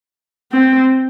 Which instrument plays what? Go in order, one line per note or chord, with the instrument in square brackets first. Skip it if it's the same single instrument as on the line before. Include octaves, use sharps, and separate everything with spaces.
[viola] C4